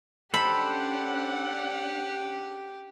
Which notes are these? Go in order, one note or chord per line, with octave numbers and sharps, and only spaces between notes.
C#4 D4 G4 A4 C5 F#5 B5